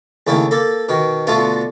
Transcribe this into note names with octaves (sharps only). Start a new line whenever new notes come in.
D#2 C#3 A3 E4
A#3 A4
B2 D#3
B2 D3 A3 B3 F4